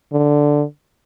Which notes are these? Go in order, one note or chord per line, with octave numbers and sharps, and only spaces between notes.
D3